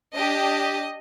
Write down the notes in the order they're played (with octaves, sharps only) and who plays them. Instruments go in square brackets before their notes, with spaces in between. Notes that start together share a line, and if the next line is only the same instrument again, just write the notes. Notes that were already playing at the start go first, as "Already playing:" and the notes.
[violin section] D4 G4 D#5